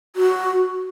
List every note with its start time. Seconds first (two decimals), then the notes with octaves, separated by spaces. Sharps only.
0.16 F#4